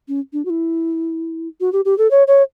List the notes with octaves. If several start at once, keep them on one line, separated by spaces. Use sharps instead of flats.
C#4
D4
F#4
E4
F#4
G4
G4
A4
C#5
C#5